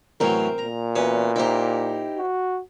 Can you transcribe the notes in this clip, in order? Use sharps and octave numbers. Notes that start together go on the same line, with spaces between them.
E2 A2 F#3 C4 A#4
A#2 A#5
E2 C#4 F#4 B4
D#4 E4 G4 C5
F#4